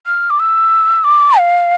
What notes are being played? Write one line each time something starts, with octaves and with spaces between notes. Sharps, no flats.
F6
D6
E6
D6
F5